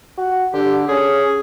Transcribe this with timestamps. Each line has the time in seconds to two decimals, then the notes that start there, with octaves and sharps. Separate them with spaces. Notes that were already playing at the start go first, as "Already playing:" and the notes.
0.17 F#4
0.53 D3 G4
0.88 C#4 G#4